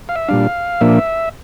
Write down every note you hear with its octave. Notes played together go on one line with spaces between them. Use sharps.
F5
E5
A#2 G3 D4 F5
A#2 F3 A#3 D4 E5